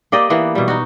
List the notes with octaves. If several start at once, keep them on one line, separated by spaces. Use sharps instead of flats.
A#3 G4 D5 D#5
E3 A#3 B3
B2 G3
D#4 F#4